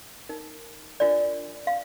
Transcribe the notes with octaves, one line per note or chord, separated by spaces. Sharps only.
D#4 A#4
D4 F4 A#4 D5
F5